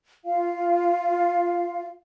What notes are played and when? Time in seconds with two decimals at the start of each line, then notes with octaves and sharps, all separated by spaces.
0.25 F4 F5